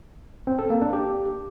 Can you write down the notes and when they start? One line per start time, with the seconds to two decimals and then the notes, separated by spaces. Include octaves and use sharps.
0.47 C4
0.59 A4
0.70 A#3
0.82 D4
0.93 G4